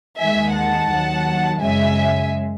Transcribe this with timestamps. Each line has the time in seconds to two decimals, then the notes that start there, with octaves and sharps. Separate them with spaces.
0.19 D#2 D#3 G#3 E5 G#5
0.55 F#5 A5
0.90 D#2 D#3 F#3
1.62 F#2 C#3 G#3 E5 G#5